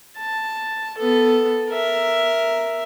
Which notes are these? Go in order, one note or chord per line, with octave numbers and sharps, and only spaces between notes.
A5
B3 A4
A#4 E5